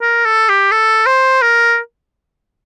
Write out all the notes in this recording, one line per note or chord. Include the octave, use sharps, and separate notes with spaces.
A#4
A4
G4
A4
C5
A#4